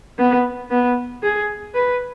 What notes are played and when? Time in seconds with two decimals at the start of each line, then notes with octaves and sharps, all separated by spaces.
0.19 B3
0.71 B3
1.23 G#4
1.75 B4